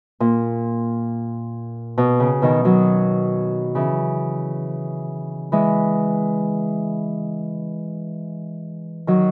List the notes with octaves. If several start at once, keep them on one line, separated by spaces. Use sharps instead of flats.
A#2
B2
C#3
B2 D#3
D#3 F#3
C#3 E3
E3 G#3
D#3 F#3